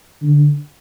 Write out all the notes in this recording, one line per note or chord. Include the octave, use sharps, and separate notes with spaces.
D3